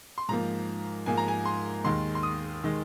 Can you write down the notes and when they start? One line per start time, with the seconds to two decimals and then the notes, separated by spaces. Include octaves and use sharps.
0.18 C6
0.29 G#2 F3 A#3 A#5
1.06 G#2 F3 A#3 G#5
1.17 A#5
1.28 G#5
1.45 C6
1.84 D#2 D#3 G#3 C6
2.15 C6
2.23 D#6
2.64 D#3 G#3